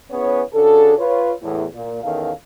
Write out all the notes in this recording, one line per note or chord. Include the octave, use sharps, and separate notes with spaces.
B3 C#4 E4 G#4 B4 C#5
C#3 D4 F#4 G#4 A4
F4 B4 C#5
E2 A2
A#2
E2 D#3 C#4 A4 A#4 F5